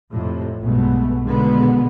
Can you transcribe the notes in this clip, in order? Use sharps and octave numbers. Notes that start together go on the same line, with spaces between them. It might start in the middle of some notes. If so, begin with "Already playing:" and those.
F2 A2 C3
B1 G2 B2 G#3 A3 B3
B2 D3 D#3 G#3 B3